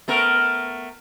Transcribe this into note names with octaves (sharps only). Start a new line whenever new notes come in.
A3 B3 A#4